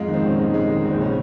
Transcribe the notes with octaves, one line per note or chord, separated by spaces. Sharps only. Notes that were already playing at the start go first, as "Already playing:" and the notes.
Already playing: F2 G#2 G#3 F4
D#3
C4
A#1 C#4
G#2 D#4
G#3
D#3
A#1
C4
C#3 C#4